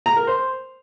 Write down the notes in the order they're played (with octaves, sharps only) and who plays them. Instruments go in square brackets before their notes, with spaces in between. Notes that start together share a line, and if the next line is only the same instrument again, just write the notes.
[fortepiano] A#5
A#4
C5